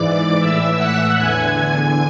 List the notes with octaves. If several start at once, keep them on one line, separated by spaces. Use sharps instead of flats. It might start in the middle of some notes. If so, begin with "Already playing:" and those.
Already playing: G#2 E3 D5 D6
A2 E3 E5 E6
F#5 F#6
E2 D3 G#5 G#6
G#5 G#6